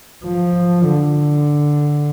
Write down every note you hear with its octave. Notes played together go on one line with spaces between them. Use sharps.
F3
D3